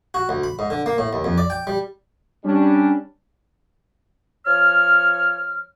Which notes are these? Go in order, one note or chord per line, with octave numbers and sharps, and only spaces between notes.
F#4
D2
B5
G#2
D3
A#3
A2
D#2
F2
D5
G5
G3
G3 C#4 D4
F3 C#5 F6